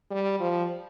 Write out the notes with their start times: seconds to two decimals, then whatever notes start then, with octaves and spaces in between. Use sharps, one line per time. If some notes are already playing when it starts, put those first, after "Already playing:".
0.10 G3
0.40 F3